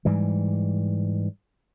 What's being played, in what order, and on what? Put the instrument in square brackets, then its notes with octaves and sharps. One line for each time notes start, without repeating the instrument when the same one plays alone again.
[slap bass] G#2 E3 G3